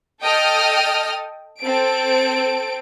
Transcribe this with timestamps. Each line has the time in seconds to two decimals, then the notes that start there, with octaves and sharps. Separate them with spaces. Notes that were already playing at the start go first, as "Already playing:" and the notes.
0.23 A4 D#5 G5 D#6 F6
1.61 C4 A4 D7